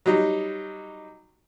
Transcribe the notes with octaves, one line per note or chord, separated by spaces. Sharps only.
F#3 G3 D#4